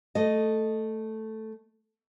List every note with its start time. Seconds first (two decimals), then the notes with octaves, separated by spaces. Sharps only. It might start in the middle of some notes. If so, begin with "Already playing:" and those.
0.15 A3 D#5